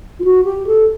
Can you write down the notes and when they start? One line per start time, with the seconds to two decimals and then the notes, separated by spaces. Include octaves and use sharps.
0.19 F4
0.24 F#4
0.45 G4
0.67 A4